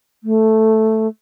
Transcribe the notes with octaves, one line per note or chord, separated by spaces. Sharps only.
A3